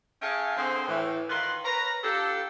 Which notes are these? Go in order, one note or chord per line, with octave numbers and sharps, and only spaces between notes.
C#4 G#4 E5 F5 G5 A5
D3 C4 G#4
A2 E3
D#3 F4 A#4 B4 C6
A#4 B4 C#5 A#5
D4 F4 G4 A4